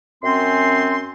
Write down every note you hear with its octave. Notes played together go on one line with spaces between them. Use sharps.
F#2 C4 C#4 C6